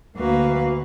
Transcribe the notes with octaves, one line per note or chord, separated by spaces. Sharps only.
D2 A#3 F#4 B4 F5